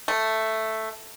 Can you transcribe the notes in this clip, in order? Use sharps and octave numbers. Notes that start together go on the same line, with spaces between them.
A3